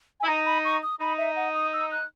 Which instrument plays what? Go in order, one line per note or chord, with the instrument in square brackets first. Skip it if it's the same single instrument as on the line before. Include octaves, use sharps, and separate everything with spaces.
[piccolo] G#5
[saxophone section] E4
[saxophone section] D#4 [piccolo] A#5
[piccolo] B5
C#6
D#6
[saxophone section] D#4 [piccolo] B5
[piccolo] E5
F#5
D#6
E6
F#6